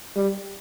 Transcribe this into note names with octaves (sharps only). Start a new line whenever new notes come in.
G3